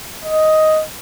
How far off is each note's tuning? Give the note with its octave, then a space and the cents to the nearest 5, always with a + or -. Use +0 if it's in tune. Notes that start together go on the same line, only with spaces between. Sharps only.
D#5 +5